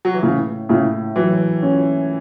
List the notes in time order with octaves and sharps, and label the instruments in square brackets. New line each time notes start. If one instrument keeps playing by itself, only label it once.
[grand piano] F#3
E3
[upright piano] A2 [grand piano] C#3
[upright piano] A2 [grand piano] C#3
[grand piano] E3 [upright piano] F#3
[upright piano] C#4